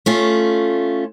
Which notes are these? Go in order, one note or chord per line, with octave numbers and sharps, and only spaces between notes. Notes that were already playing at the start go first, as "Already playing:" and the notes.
A3 C#4 F4